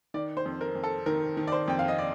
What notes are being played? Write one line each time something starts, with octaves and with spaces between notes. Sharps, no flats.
D#3 D5
C5
F2
A#4
F2
A4
D#3 A#4
D#3
D5
C5
F2 G5
F5
D#5
D5